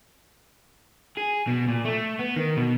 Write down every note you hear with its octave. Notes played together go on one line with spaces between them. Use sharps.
G#4
B2
A#2
A3
B3
D#3
B2